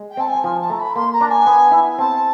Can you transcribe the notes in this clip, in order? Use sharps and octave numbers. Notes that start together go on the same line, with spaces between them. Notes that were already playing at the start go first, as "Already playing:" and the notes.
Already playing: G#3
G5
C4 A5
G#5
F3 G#5
A5
A3 A#5
B5
A#3 C6
A#5
D4
G#5
B3
E4
C4 A5